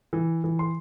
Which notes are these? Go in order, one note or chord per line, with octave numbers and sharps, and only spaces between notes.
E3
E3
C6